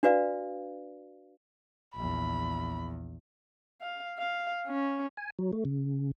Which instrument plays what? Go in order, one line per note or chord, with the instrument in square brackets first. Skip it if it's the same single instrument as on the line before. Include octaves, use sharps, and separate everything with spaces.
[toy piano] D4 F#4 B4 D5 F5
[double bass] A#1 E2 [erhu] B5
[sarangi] F5
F5
C#4
[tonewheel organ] G#5
F#3
A3
C#3